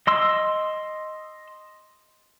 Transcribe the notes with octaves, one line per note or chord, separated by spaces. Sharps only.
D#5 C6 E6